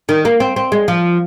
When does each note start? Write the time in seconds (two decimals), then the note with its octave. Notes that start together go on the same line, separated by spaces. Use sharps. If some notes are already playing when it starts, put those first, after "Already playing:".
0.09 D#3
0.25 A#3
0.40 C4
0.56 C4
0.72 G#3
0.88 F3